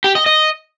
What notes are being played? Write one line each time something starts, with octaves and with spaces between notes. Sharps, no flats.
G4
D#5
D#5